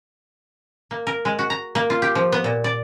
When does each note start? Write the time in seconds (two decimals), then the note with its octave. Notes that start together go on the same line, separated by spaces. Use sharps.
0.91 A#3
1.07 A#4
1.25 G#3
1.39 F#4
1.50 A#5
1.75 A#3
1.90 F4
2.02 G4
2.15 F3
2.32 B3
2.44 A#2
2.64 D5